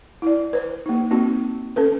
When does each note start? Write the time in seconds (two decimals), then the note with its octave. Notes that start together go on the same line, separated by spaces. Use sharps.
0.22 E4 D5
0.53 B4 C5
0.86 A#3 D#4
1.11 A#3 C4 D#4 F#4
1.76 C#4 A4 B4